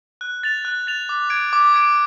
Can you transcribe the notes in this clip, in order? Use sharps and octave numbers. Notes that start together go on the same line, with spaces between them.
F#6
A6 F7
F#6
A6 F7
D6
G#6 D7
D6
G#6 D7